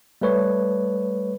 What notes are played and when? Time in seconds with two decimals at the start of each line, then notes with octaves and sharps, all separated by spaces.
0.21 G3 A3 B4 C#5